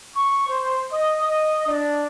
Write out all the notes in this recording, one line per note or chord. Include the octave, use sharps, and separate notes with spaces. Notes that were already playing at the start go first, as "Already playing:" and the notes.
C#6
C5
D#5
D#5
D4